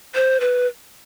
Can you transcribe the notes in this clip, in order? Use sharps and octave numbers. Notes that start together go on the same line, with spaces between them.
C5
B4